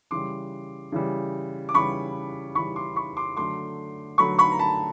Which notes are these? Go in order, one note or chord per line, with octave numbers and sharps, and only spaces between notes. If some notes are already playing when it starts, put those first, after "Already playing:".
C#3 E3 G3 C6 D6
C#3 E3 G3
D6
C#3 E3 G3 B5 C#6
C#3 E3 G3 B5 C#6
C6 D6
B5 C#6
C6 D6
D3 F#3 A3 C6 D6
D3 F#3 A3 B5 C#6
B5 C#6
A#5
A5 B5